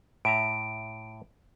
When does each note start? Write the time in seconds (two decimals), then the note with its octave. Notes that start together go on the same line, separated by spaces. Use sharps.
0.25 A2 E5 A#5 D7